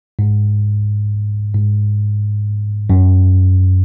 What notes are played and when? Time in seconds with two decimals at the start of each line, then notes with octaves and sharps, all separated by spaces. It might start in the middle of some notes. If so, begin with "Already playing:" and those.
0.19 G#2
1.54 G#2
2.90 F#2